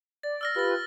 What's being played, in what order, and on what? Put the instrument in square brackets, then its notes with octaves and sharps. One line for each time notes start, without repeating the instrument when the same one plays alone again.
[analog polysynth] D5 [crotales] A6
[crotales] E6 F6 A#6
[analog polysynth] F4 G4 B4 [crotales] F6 A6